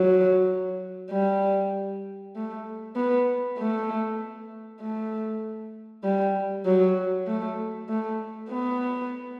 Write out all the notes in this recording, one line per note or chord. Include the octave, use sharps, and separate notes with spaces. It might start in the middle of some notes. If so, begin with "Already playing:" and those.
Already playing: F#3
G3
A3
B3
A3
A3
G3
F#3
A3
A3
B3